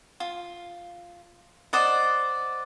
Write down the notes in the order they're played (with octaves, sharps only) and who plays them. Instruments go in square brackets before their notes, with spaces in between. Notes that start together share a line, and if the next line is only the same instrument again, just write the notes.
[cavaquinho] F4
C5 D5 D#5 F#5